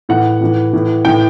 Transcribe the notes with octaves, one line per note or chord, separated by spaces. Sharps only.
A2 E3 F#5
A2 E3
A2 E3
A2 E3 G5